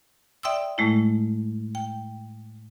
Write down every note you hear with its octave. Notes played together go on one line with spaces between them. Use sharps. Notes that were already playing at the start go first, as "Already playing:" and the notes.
D5 E5 G5 C6 D#6 E6
A2 G#3 A3 E4
G5